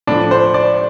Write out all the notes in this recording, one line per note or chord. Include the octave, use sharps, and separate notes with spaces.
A2 F3 D4
C5
D5